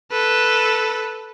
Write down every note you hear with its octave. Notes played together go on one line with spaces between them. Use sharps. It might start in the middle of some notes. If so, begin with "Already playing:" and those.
A4 B4